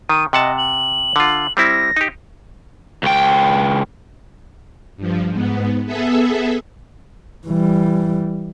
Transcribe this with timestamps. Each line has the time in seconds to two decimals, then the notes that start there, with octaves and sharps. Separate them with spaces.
0.09 D#3 D#7
0.33 C3 D#5 F#5 A5
0.58 F#7
1.16 D3 F4
1.57 G3 C4 E4 A#6
1.97 D#4 G4
3.03 C#2 G5
4.97 G2 F3
5.30 G#2 B3
5.86 B3 G#4 A4 E5
7.46 E3 G3